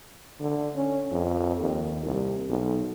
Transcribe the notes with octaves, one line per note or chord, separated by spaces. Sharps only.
D3
C#4
F2
D#2
C2
B1